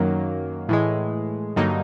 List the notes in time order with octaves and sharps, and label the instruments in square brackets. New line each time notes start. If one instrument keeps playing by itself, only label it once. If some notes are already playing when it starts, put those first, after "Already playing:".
Already playing: [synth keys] F#2 D#3 F#3 A#3
A2 E3 G#3
G2 D3 F#3 A#3 D#4